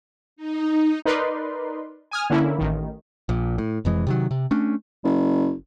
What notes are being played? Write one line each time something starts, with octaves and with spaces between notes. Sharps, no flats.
D#4
D#4 A#4 B4 D5 C6
G#5 D#6 F6
D3 A#3 C#4 E4
A1 D#3
A#1 A#2
A2
F1 F2 E3 G#3
C3 D#3 F#3
C3
A3 C#4 D4
F#1